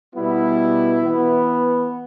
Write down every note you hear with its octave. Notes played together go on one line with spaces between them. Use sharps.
B2 G3 B3 E4
E3 B3